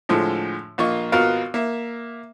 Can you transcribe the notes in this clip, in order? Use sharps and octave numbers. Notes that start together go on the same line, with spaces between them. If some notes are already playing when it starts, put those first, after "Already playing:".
A2 D3 F3 G#3
A#1 A#3 F4 D#5 C#6
G#1 B3 F4 F#4 A#4 F5
A#3 E5